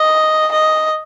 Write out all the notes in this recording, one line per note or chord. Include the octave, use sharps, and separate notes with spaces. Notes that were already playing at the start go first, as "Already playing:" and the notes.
Already playing: D#5
D#5